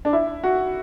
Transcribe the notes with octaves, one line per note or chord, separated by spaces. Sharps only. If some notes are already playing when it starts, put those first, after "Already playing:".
D4
E4
F#4